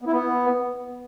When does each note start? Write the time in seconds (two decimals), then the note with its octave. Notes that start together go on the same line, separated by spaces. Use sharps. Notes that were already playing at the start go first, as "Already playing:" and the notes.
0.02 B3
0.07 E4
0.12 B3